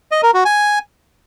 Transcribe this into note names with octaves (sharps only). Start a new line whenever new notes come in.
D#5
A#4
F#4
G#5